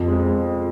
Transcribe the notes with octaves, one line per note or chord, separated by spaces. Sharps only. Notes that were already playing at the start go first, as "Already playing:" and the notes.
Already playing: F2
G#3